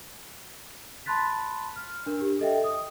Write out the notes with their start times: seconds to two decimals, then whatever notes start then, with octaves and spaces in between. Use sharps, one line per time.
1.06 A5 B5 C6 F#6 A6 B6
1.76 F6
2.06 D4 A#4
2.21 G4
2.40 A4 D#5 E5 G5
2.64 D#6